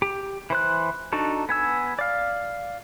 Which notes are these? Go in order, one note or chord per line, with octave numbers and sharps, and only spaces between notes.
G4
E3 C5 F#6
D4 D#4 F#4 A4
B3 G#5 E6
D5 F5